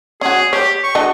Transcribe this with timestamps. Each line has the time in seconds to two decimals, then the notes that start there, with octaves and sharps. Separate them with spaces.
0.21 C#4 F#4 G#4
0.53 G4 C#5
0.84 C#6
0.95 D4 F#4 D#5